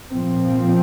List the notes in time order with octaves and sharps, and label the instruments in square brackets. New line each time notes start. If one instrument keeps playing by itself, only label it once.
[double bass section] A#2 F3 C4